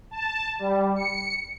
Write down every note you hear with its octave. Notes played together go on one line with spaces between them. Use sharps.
A5
G3
C#7